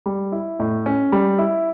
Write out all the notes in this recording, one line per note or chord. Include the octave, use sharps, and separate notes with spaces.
G3
E4
A2
C#4
G3
E4